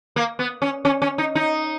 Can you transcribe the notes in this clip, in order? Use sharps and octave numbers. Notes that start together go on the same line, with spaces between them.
A#3
B3
C#4
C#4
C#4
D#4
D#4